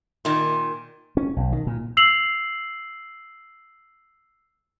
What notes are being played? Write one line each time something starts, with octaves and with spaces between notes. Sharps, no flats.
A#2 D#3
C#4
B1
D#3
A#2
E6 C7 F7 F#7